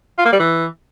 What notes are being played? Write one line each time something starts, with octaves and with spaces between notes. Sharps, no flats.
F4
A#3
G3
E3